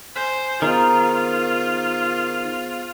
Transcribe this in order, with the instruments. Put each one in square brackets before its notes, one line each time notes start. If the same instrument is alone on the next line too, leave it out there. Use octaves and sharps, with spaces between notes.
[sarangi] C5 [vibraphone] G#5
[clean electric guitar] D#3 [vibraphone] B3 G#4 C5 [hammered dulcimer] D#4 [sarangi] F4